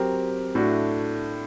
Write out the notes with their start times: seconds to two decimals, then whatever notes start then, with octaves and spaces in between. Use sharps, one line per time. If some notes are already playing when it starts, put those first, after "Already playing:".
Already playing: F#3 C4 G4 A#4
0.55 A2 A3 D4 F#4